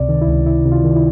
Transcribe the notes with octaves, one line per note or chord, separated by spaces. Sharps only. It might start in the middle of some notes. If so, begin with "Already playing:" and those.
Already playing: C#2 C3 D5
D#3
E4
C#2
C#2 E4
C3
F4
D#3
E4